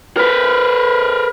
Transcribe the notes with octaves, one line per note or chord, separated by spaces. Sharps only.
A#4 B4